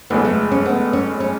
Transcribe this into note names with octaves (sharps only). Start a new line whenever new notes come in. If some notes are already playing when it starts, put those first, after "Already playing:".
F1 F2 C#3 G#3 B3
A3
C#4
B3
C#4
C#4